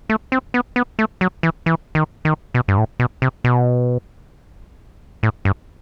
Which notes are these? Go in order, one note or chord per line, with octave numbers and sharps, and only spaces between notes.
A3
C4
B3
B3
A3
F#3
E3
E3
D#3
D#3
B2
G2
A2
B2
C3
B2
A2
G2